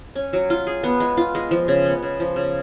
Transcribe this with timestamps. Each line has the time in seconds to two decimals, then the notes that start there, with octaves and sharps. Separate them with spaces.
0.15 C#4
0.33 F#3
0.50 F4
0.67 G#4
0.84 B3
1.00 G#3
1.17 F4
1.35 G#3
1.51 F3
1.68 C#3
1.85 B3
2.03 C#3
2.20 F3
2.36 C#3